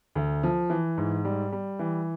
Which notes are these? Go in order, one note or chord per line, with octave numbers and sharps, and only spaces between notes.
D2
F3
E3
G#2
G3
G3
E3